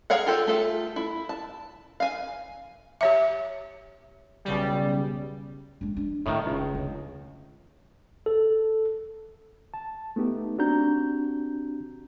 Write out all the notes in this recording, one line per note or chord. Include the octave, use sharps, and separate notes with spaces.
G#4 A#4 C#5 F5 F#5
F4 G4 A4
A3 F4 A4
E4
A5
F5 G#5
G4 C#5 E5
B1 C#3 G3
G#3 D4
D4
F1 A2 D#3
C#2
D2
A4
A5
A3 B3 D#4 G4
C4 D4 F#4 G4 A#5 G6